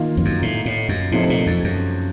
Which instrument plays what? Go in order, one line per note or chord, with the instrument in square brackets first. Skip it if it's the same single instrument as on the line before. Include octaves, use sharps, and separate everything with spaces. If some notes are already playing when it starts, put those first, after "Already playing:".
Already playing: [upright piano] D#3 A#3 F4
[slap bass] F2
F#2
A2
A2
F#2
[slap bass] A2 [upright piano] C3 F3 A3 D#4
[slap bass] A#2
F2
F#2